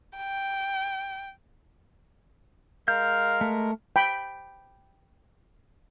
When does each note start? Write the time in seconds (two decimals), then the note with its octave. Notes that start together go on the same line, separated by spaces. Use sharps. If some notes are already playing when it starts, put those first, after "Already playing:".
0.17 G5
2.88 G#3 A#4 F5 G6
3.41 A3
3.96 G5 B5